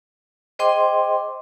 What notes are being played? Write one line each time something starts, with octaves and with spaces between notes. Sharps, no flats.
G#4 C5 D#5 G5 C6 D6